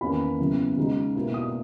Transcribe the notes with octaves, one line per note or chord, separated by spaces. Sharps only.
E2 D#3 A#3 C#4 B5
F#2 C#3 F#3 B3 E4
C#3 G#3 D#4
B2 A#3 E4
D#6